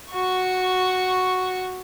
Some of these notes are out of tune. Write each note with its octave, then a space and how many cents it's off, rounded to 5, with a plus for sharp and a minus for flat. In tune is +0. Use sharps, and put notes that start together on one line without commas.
F#4 +0 C#6 +0